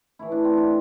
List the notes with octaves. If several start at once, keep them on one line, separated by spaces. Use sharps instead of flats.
A2 E3 A3 E4
D4
C4
D4